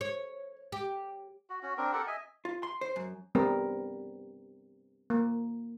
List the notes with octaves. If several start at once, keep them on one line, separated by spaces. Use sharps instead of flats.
C#5
G4
F#4
C#4 F#4
C4 D4 A#4
G4 A4 A#4 F#5
D#5 E5 G#5
F4
C6
C5
F#2
G3 B3 C4 A#4
A#3